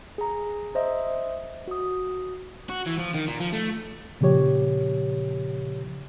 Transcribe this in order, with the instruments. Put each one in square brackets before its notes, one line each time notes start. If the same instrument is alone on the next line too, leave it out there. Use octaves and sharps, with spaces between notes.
[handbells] G#4 A#5
C5 D#5 E5
F#4 D#6
[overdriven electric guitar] F#4
E3
F3
D#3
A#2
F3
A3
[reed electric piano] A#2 C#3 F3 G4 C#5